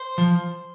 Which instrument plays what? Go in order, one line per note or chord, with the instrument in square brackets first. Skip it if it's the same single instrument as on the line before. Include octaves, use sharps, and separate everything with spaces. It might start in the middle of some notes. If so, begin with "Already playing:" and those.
Already playing: [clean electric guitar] C5
F3